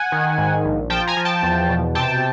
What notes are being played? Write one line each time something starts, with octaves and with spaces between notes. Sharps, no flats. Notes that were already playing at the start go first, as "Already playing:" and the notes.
Already playing: F#5 G#5
D#3
G#2
A#1
F3 G5 A5
G#5 A#5
F3
G5 A5
E2
B2
C3 G5 A5